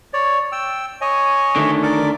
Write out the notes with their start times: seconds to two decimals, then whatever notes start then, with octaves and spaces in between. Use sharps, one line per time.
0.13 C#5 D5
0.52 G5 E6
1.01 C#5 D#5 G#5
1.56 D3 D#3 A3
1.83 A#4 D5 D6